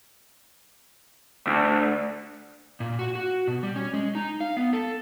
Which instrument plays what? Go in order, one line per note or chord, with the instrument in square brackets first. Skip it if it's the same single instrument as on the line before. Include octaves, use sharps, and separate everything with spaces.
[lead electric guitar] D2
[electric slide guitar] A#2
F#4
F#4
B2
G3
C#4
G#3
D#4
F5
B3
A4